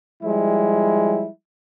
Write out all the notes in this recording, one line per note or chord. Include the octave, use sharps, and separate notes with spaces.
F3 G3 G#3 E4